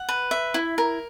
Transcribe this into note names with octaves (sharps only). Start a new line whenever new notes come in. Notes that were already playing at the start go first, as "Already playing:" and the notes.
Already playing: F#5
B4
E5
E4
A#4